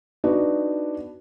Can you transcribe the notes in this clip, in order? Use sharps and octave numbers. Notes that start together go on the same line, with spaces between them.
B3 D4 D#4 F#4 D5